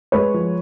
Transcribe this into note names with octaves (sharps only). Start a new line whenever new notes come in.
G#3 B4 C#5
F3